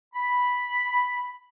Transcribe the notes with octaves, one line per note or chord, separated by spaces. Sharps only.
B5